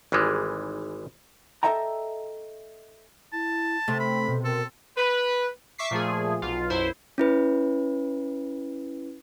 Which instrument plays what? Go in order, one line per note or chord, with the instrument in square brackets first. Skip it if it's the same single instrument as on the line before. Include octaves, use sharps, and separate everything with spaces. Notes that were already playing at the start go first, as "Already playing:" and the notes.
[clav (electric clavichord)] G#1 E3 G3 G#3
[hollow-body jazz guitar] A4 B4 D#5 E5 G5 A#5
[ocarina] E4 [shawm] A5
[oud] C3 [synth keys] A3 [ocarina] A4
[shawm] B5
[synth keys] B2
[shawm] A4 [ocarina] A#4
[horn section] B4
[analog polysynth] E5 C#6 D6 B6 C7
A#2 F3 A3 G#4
B1 F4
B1 F#2 E4 C5
[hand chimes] C#4 E4 B4